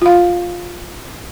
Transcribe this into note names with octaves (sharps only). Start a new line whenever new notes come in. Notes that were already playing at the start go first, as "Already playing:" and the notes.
F4 F5